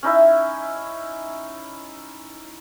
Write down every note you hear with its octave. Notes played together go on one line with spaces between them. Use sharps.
C#4 D#4 E4 E5